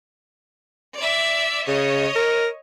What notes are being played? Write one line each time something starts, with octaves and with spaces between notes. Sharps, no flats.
D5 E5
C#3 C#5 D#5
A#4